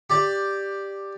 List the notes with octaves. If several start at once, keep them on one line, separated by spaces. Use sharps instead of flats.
G4 D5